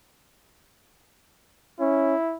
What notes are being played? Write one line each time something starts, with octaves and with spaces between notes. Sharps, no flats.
C#4 E4